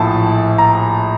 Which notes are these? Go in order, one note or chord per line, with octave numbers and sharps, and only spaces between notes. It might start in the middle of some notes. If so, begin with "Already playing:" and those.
Already playing: A#1 A2 F3 A5
A#5